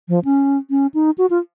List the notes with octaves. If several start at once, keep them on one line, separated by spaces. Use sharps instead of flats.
F3
C#4
C#4
D#4
F#4
F4